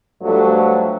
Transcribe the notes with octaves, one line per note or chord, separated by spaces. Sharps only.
G2 F3 F#3 A3 A4